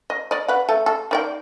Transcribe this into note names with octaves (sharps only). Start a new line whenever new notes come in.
D#5
D5 D#5
B4 F#5
A3 A4
A4
D#3 D5 G5